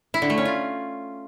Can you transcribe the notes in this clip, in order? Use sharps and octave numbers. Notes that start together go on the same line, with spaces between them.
E4
D3
A3
C#4
F4